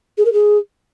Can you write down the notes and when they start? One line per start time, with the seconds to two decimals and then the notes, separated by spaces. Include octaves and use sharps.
0.17 G#4
0.25 A#4
0.32 G#4